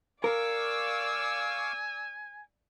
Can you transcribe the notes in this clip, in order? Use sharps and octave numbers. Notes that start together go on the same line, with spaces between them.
A#4 D5 F5 G#5 C#6 D6 E6